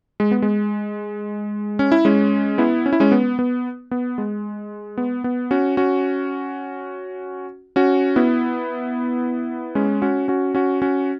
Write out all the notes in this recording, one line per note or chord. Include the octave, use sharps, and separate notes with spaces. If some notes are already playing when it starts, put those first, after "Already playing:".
G#3
B3
G#3
C#4
E4
G#3 C#4
B3 E4
C#4
E4
G#3 C#4
B3
B3
B3
G#3
B3
B3
C#4 F#4
C#4 F#4
C#4 F#4
B3 E4
G#3 C#4
C#4 F#4
C#4 F#4
C#4 F#4
C#4 F#4